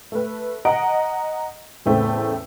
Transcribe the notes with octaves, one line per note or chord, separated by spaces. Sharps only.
A3 B4
D#5 F#5 A#5 D7
E2 A2 C#3 A3 C4